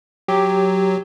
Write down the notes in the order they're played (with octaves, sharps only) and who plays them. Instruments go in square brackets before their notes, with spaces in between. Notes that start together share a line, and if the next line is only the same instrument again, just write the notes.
[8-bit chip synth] F#3 [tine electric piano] G4